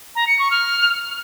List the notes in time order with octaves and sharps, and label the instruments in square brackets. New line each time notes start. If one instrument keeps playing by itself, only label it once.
[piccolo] A#5
C#7
C#6
F6